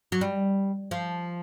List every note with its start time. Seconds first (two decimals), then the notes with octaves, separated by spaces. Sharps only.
0.12 F#3
0.21 G3
0.91 F3